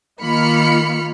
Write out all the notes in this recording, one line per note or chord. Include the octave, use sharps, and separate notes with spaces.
D#3 A#3 F4 B5 F6 C#7